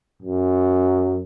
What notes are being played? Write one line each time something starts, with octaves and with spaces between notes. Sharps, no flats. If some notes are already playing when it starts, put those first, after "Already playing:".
F#2